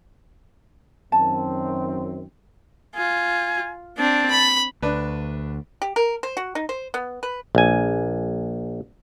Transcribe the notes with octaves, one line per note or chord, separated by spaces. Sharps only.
F#2 D#3 C4 A5
F4 G#5
C4 D4 A5
B5
D2 D4 B4
G4
A#4
C5
F#4
D#4
C5
B3
B4
A#1 G#5